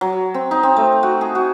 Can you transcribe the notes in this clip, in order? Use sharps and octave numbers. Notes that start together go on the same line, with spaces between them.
F#3
C4
D#4
C4
A3
F#4
G#4
F#4